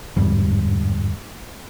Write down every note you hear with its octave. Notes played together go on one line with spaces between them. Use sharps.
G1 E2 G#2 G3